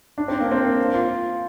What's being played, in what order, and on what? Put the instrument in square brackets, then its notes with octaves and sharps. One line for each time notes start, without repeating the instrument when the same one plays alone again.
[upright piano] D4
C4
A#3
C4
F4